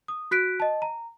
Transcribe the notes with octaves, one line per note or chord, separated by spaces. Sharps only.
D#6
F#4 F#6 B6 D7
D#5 A5
A#5